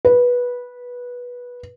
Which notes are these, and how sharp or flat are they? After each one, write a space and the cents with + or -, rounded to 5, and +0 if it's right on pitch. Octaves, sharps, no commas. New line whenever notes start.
B4 -15